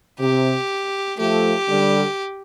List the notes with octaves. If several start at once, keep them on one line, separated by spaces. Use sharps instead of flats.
C3 G4
F3 A3 G4
D3 G3